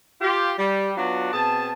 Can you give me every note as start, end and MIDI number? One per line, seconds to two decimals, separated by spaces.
0.22 0.52 65
0.22 0.52 67
0.59 0.92 55
0.97 1.31 54
0.97 1.31 59
0.97 1.31 62
0.97 1.31 65
0.97 1.31 66
1.34 1.71 47
1.34 1.71 60
1.34 1.71 68
1.34 1.71 81